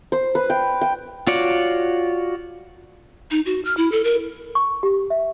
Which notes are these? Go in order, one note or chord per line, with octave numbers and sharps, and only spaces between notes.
C5
B4
G5
G5
F4 F#4 C#5 D5
D#4
F#4
F6
E4
A4
A#4
C#6
G4
E5